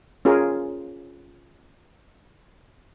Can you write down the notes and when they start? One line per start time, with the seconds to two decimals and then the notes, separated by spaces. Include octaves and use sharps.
0.25 C#4 F4 G#4 A#4